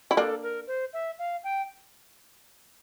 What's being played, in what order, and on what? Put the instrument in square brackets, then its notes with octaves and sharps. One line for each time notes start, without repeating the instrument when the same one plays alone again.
[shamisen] E4
[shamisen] A#3 D4 [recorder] A4
[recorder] A#4
C5
E5
F5
G5